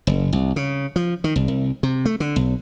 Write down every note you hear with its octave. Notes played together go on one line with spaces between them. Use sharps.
F#1
C2
C#3
F3
D#3
C2
C2
C3
A3
D3
B1